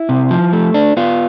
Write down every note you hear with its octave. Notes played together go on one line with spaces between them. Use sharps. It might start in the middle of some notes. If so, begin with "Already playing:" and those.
Already playing: E4
C3
F3
A3
D4
B3 F4